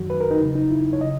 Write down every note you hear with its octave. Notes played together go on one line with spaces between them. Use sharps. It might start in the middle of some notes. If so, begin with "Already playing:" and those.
Already playing: F#2 D#3 F#3 F#4
B4
A#4
D#4
E2 C#3 F#3
D#4
E4
C#5
C#3 D#5